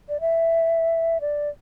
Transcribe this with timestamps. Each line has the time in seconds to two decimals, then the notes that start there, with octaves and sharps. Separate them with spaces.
0.09 D5
0.21 E5
1.21 D5